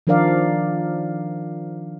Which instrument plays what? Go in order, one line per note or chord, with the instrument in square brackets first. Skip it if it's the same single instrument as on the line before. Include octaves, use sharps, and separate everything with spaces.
[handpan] D#3 F3 D4 A#4 D5 F5